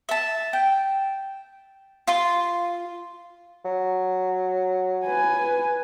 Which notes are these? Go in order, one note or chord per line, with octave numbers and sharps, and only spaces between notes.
E5 A5
G5
F4 C6
F#3
B4 G#5